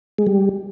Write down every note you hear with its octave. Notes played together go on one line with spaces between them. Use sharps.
G#3
G3